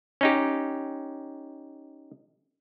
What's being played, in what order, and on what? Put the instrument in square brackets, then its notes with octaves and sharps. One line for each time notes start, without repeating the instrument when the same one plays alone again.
[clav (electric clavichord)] C#4 D#4 G4